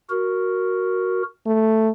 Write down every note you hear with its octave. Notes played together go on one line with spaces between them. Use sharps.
F#4 A#4
A3